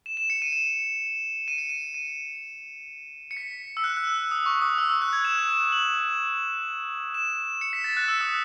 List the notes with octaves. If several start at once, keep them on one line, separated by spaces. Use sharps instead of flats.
E7
E7
C#7
D#7
E7
D#7
C#7
D#7
D#7
C#7
B6
E6
F#6
F#6
E6
D#6
C#6
D#6
E6
E6
F#6
G#6
E7
E7
F#7
E7
C#7
B6
A6
F#6
E6
D#6